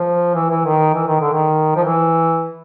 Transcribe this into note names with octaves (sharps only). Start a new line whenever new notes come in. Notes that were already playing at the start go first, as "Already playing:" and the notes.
Already playing: F3
E3
E3
D#3
E3
D#3
D3
D#3
F3
E3